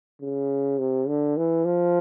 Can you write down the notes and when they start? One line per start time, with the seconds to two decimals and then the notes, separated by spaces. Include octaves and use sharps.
0.22 C#3
0.79 C3
1.08 D3
1.37 E3
1.65 F3